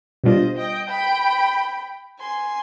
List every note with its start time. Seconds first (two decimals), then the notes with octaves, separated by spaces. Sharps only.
0.24 B2 G3 D4 F4 C5 D#5
0.57 D#5 G5
0.89 G5 B5
2.19 G#5 C6